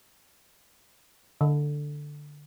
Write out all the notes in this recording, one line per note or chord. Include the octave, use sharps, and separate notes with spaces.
D3